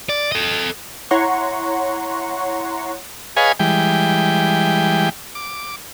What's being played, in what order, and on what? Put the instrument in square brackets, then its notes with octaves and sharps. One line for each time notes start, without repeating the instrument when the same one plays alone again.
[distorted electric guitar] D5
A4 D#5
[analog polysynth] E4 C#5 F#5 A#5 C6 C#6
[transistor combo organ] G#4 B4 C#5 D#5 F5 G#5
E3 G3 G#3 G5
D6